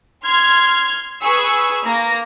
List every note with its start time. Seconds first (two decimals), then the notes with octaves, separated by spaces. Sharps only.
0.23 C6 F6 G#6
1.22 G#4 B4 C#6 E6
1.85 A#3 A#6